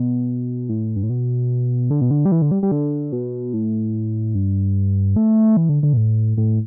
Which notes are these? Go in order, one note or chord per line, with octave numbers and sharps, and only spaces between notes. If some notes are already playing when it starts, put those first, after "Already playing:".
Already playing: B2
A2
G2
A2
B2
D3
B2
D3
G3
E3
D3
G3
G3
D3
B2
A2
G2
A3
E3
D3
D3
B2
A2
A2